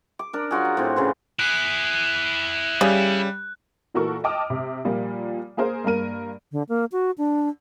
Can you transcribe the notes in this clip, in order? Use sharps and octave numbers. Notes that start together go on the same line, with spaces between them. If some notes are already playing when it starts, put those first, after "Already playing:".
D6
D4 A#4
F#3 F4 F#4 G#4
A#5
A2 C4
C#3 E3 C6
E4 G#4 F#6
C#3 G3
A#2 E3 F#4 A4 A#4 C#6
D#5 G5 A5 D6 D#6 F6
C3
A#2 F3 G3 A#3
A#3 G#4 A#4 C5
G2 A#3 A#4 D#7
D3
A#3
F#4
D4